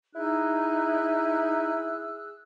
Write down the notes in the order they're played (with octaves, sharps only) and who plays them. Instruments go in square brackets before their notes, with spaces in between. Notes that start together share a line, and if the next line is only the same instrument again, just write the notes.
[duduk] D#4 [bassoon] E4 [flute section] G#4 E6 F#6